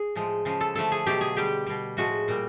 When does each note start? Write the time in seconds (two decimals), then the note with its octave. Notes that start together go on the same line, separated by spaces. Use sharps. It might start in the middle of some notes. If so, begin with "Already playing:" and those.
Already playing: G#4
0.15 A2 F3 G#3
0.45 C#3 F3 G#3
0.61 A4
0.75 D3 F3 A3 A4
0.92 G#4
1.06 B2 F#3 A3 G4
1.21 G#4
1.36 D3 G3 G4
1.67 B2 G3
1.97 A2 F3 G#3 F#4
2.28 A#2 G3